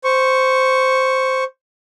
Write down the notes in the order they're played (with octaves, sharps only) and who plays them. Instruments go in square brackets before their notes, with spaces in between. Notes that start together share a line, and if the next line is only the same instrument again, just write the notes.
[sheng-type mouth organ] C5 C#6